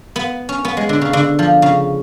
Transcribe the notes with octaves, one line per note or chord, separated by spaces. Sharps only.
B3
C#4
B3
G#3
D3
C#3
D3
F3
C#3